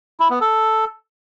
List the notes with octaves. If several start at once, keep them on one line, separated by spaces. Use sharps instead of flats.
E4
B3
A4